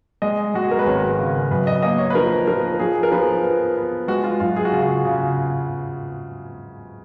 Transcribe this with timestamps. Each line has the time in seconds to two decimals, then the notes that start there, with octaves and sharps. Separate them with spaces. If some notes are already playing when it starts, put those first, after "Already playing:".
0.22 G#3 D#5
0.54 G#3 F#4
0.63 G#4
0.71 A#4
0.79 B4
0.87 G#1 C#5
1.18 C#3
1.51 F#2 B4
1.67 D#5
1.82 A#3 D#5
1.98 C#5
2.10 B4
2.15 F3 A#4
2.47 F3 A#4
2.79 F3 G#4
2.95 G#4
3.03 A#4
3.12 F3 B4
3.43 B3
3.76 B3
4.08 G#3 F#4
4.24 F4
4.40 F#2 F4
4.56 G#4
4.65 F#4
4.72 C#3 F4
4.82 F#4
5.05 C#3